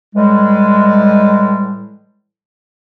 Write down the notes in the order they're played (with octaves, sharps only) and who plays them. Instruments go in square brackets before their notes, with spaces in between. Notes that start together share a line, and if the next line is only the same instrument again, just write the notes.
[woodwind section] A2 E3 G3 G#3